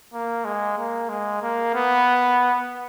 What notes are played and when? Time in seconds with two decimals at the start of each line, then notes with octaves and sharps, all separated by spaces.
0.13 A#3
0.45 G#3
0.78 A#3
1.09 G#3
1.42 A#3
1.74 B3